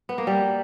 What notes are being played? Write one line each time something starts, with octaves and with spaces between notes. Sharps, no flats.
B3
A#3
G3